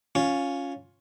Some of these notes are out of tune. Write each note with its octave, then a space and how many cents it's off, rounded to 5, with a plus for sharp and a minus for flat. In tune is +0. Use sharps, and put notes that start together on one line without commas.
C#4 +0 F4 +10